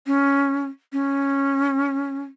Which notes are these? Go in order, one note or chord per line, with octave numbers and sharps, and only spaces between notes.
C#4
C#4